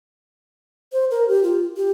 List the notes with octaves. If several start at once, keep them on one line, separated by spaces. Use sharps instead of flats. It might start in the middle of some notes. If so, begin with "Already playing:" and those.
C5
A#4
G4
F4
G4